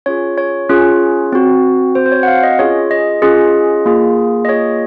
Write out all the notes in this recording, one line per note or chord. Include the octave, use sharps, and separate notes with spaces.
C#4 F4 G#4 C#5
C#5
C#4 F4 G#4
C4 F#4
C4 F#4 C5
C5
C#5
F#5
F5
D#5
C#4 F4 G#4 C#5
D#5
C#4 F4 G#4
A#3 F4 G#4
D#5
A#3 F4 G#4 C#5